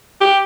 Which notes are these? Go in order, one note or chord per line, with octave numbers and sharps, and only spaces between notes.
G4